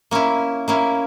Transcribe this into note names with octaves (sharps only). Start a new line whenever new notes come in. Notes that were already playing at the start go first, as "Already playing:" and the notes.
A#3 C#4 E4
A#3 C#4 E4